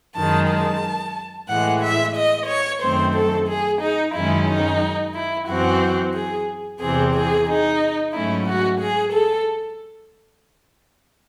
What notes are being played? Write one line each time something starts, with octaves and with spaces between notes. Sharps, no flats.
F#2 D#3 G#3 A5
A5
A2 E3 G#3 F#5
E5
D#5
C#5
F#2 D#3 A3 C4 C5
A4
G#4
D#4
F#2 D#3 G#3 C#4 E4
D#4
E4
F#2 E3 C4 F#4
G#4
E2 C3 E3 C4 G#4
G#4
D#4
G#2 F#3 A3 C#4 E4
F#4
G#4
A4